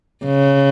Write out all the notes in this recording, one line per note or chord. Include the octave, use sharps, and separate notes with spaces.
C#3